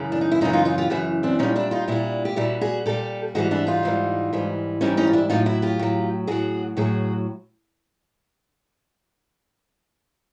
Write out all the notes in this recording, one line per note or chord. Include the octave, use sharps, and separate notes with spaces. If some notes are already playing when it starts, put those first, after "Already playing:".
Already playing: F#2 C#3 E3
D4
D#4
E4
F#2 C#3 E3 D#4 F4
D#4 F4
D#4 F4
F4 G4
F#2 C#3 E3 E4 F#4
C4 D4
A#2 G3 C#4 D#4
D4 E4
D#4 F4
A#2 G3 D4 E4
G4
A#2 G3 E4 F#4
F#4 G#4
A#2 G3 G4 A4
G#2 E3 G3 F#4 G#4
D4 E4
D#4 F4
G#2 E3 G3
G#2 E3 G3
G#2 E3 G3 C#4 D#4
C#4 D#4
F4
D4 E4
A2 F#3 D#4 F4
E4 F#4
F4 G4
A2 F#3
A2 F#3 F#4 G#4
A2 F#3 F#4 G#4